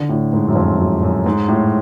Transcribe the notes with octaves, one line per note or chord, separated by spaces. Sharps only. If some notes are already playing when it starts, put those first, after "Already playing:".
Already playing: D3
A2
G#2
F#2
F2
F#2
F#2
G#2
A2